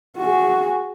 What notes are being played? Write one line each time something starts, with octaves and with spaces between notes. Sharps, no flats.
F#4 G#4